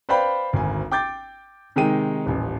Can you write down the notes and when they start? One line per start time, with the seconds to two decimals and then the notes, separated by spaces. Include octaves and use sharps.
0.09 B4 C5 D5 F5 G5 B5
0.53 G#1 D2 G#5
0.91 G5 D6 G6 A6
1.76 C3 D#3 G#3 D#4 G5 D#7
2.26 D#1 A1